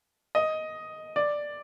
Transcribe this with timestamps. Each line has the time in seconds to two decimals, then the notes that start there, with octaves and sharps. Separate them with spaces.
0.35 D#5
1.16 D5